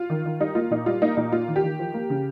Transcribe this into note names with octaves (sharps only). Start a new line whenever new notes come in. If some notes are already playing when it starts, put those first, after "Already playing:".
Already playing: F4
D#3
D#3
G3 D#4
A#3 F4
A#2 D#4
G3 F4
A#3 D#4
A#2 D#4
A#3 F4
D#3
G4
D#3
F3
A#3
C#3